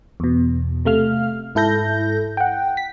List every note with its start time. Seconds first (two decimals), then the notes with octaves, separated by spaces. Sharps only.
0.20 E2 B2
0.85 C3 A3 F5 F6
1.55 G#2 E4 A4 G6 A#6
2.37 F#5 G5
2.77 B6